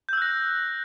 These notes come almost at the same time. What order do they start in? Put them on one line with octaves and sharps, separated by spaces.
G6 E6 F#6 A#6